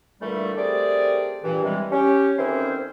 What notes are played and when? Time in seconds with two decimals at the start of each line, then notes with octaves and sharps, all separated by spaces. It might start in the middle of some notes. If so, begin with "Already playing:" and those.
0.21 A#2 D3 E3 G3 A3
0.57 G3 A3 C4 G#4 A#4 D5
1.43 G2 A#2 E3
1.63 C3 E3 G3 G#3
1.91 C#4 G4
2.38 D2 D#3 E3 C4 C#4 C5